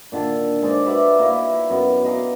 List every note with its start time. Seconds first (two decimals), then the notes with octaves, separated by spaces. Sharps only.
0.12 A#2 D3 D#3 A4
0.62 G#3 D#4 C5 D5
0.86 F#4 B4 D5 E5
1.19 A#3 D#4 E4
1.70 F#2 B3
2.04 D#5 F5 A#5 D6